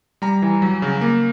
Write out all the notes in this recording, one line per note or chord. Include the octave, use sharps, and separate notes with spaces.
G3 A#5
E3
F#3
C#3
A#3